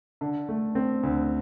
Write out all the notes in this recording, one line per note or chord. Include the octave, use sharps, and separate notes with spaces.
D3
A3
C4
D2